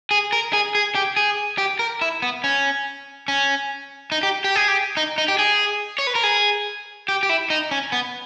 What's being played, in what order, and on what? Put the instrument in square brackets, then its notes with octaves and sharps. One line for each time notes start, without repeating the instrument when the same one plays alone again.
[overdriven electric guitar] G#4
A#4
G#4
G#4
G4
G#4
G4
A#4
E4
B3
C#4
C#4
D#4
G4
G4
G#4
G4
D#4
D#4
G4
G#4
C#5
B4
A#4
G#4
G4
G4
E4
D#4
C#4
B3